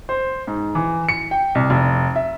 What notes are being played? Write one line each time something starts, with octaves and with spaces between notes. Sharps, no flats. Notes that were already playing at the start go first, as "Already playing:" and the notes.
C5
G#2
E3
C#7
G5
C2
F1
E5